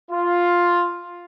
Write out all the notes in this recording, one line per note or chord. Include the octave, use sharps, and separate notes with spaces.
F4